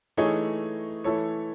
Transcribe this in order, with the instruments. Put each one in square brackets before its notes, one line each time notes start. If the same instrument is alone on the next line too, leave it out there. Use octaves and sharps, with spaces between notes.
[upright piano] E3 A3 D#4 G#4 C#5
E3 A3 E4 A4 C#5